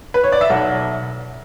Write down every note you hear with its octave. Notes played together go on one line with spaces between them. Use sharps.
B4
C#5
D5
E5
B1 F#5